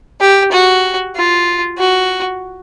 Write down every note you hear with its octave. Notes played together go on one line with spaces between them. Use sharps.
G4
F#4
F4
F#4